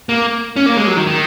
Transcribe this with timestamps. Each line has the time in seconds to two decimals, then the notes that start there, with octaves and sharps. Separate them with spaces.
0.09 A#3
0.56 C#4
0.66 A#3
0.77 G#3
0.87 F#3
0.97 D#3
1.07 D#3